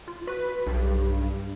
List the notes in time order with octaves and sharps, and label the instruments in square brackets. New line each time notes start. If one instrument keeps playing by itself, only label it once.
[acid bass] F4
[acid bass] F#4 [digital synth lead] B4
[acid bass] B1 [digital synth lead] G2